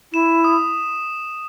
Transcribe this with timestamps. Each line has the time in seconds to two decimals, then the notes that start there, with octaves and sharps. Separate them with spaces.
0.12 E4 E7
0.44 D#6